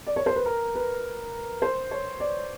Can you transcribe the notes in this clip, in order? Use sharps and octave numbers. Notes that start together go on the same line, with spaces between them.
D5
C#5
C5
B4
A#4
B4
C5
C#5
D5